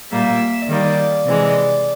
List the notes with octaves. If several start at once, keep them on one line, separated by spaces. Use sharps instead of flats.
A#2 G3 A#3 E5
D#3 G3 A#3 D5
C3 E3 G#3